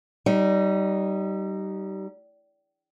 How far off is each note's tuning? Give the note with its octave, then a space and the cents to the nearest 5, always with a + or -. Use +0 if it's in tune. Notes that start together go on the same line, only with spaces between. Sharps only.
G3 -25 D#4 +0